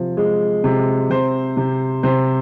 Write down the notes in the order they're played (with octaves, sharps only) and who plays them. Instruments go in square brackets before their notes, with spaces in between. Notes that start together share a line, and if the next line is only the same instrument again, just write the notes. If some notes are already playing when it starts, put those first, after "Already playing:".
Already playing: [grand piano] C3 F3
G#3
C3
C3 C5
C3
C3 C5